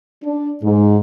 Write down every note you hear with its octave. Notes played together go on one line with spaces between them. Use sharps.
D4
G#2